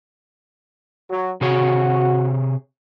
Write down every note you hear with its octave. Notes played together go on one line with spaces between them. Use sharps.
F#3
C3 F#4 G#4 C#5